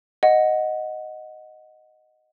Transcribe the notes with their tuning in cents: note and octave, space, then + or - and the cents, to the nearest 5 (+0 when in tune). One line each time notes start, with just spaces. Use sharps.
D#5 +0 F#5 -5